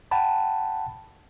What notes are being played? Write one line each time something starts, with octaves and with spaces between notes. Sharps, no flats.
F#5 G5 A5 B5